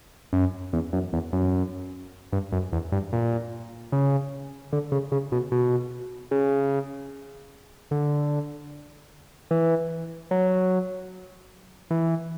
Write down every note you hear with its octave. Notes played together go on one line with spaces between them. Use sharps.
F#2
E2
F#2
E2
F#2
G2
F#2
E2
G2
A#2
C#3
D3
C#3
C#3
B2
B2
C#3
D3
E3
F#3
E3